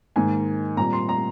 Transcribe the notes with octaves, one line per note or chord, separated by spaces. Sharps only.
G#2 D#3 A#3 G#5
A#2 G3 C4 A#5
C6
A#5